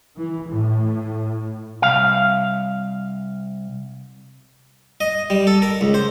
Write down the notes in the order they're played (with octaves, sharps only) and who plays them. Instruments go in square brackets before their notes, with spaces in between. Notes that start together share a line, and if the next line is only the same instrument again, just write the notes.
[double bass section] E3
A2
[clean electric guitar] C2 F5
[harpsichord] D#5
G3
A4
A#4
C#2
C5